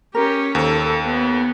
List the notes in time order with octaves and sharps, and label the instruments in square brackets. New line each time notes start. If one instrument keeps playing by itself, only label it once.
[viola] C#4 G4 [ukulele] A#4
[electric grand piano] D#2 [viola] A4 [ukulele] C5
[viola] B3